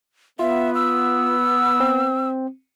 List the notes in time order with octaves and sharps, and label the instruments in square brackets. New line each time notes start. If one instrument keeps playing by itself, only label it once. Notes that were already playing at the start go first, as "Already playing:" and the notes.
[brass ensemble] B3 [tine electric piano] F4 [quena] E5
[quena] E6
[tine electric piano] C4